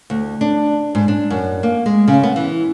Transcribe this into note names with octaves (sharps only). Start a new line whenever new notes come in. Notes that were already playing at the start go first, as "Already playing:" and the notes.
D2
D4
G#2
D4
F#2
A#3
G#3
C#3
B3
E3